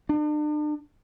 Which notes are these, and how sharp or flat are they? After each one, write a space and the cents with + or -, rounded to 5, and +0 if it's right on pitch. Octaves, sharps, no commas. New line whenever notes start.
D4 +40